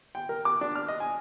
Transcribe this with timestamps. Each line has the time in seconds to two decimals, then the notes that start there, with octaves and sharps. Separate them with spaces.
0.15 G5
0.29 A#4
0.45 D6
0.61 D4
0.76 F6
0.88 D#5
1.00 G#5